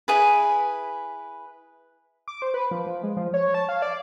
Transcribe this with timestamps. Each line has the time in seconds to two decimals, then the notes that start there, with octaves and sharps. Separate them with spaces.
0.08 E4 G#4 B4
2.28 D6
2.42 C5
2.54 B4
2.71 F3
2.87 F3
3.03 G#3
3.17 F3
3.34 C#5
3.54 A5
3.69 F5
3.82 D5